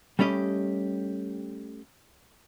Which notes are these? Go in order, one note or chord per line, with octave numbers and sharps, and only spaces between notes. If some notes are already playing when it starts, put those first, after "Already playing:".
G3 A3 C#4 G4 D#5